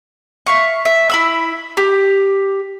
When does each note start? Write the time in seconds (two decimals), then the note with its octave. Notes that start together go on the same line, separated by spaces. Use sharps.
0.47 E5 F5 C#6
0.85 E5
1.10 E4 B5 E6
1.77 G4